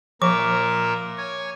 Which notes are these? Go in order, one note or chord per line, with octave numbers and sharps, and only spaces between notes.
A#2 F3 A#4 E5 D6
C#5 G#5